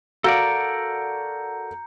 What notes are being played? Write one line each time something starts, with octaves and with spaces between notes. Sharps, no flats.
F#4 A4 A#4 D5 F5 A#5 G6 C#7